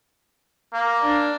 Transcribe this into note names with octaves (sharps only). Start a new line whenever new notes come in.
A#3
D4